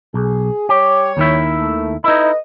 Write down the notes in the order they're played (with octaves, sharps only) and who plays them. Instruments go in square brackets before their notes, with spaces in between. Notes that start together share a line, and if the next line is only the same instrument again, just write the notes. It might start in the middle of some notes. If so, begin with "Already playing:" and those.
[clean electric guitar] B1 [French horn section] G#4
[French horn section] G3 C#5 [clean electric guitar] G4
[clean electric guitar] D#2 D#3 E4
[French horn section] A3
[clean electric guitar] D#4 E4 [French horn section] A4 B4 D#5